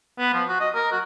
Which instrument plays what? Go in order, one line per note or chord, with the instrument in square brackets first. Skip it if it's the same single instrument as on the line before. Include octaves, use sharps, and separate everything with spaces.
[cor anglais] B3
F3
F#4
D#5
A#4
F#4